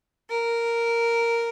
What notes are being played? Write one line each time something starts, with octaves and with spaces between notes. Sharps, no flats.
A#4